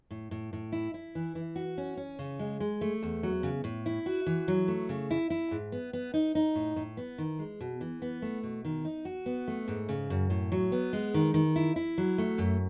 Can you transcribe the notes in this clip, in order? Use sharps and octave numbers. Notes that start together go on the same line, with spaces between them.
A2
A2
A2
E4
E4
E3
E3
F#4
C#4
C#4
C#3
G#3
G#3
A3
E2
F#3
C#3
A2
E4
F#4
E3
F#3
A3
C#3
E4
E4
G#2
B3
B3
D#4
D#4
A2
A2
B3
D#3
G#3
B2
E3
B3
A3
B2
D#3
D#4
F#4
B3
A3
G#2
C#3
F#2
A2
F#3
B3
G#3
D#3
D#3
E4
E4
F#3
A3
F#2